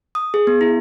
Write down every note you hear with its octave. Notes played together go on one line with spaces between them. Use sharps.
D#6
G#4
B3
E4